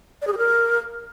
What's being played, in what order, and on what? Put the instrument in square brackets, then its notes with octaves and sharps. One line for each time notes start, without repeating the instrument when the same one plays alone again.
[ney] D5
G#4
G4
A#4